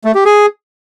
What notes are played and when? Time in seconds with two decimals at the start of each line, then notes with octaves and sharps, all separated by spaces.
0.04 A3
0.15 G4
0.25 G#4